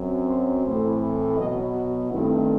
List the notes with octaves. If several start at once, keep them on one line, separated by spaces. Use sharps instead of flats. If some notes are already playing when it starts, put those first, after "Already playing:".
Already playing: F#2 F#3 C4
C5
A2 E3 A3 C4 C5
B2 F#3 B3 D#5
F#4
G2 D#3 A3 C4 E4